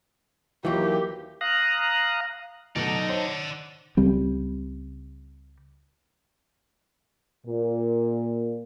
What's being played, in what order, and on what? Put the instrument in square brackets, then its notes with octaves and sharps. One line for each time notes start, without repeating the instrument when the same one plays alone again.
[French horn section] D#2 A#3 F4 [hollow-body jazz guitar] E3 F#3 [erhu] G4
[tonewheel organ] F5 A#5 D#6 F#6
[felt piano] B2 F#3 A3 [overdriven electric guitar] D#4 [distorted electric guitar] D5 F#5
[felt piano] C5 C#5 A5
[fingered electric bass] C#2 C#3 G3 C4
[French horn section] A#2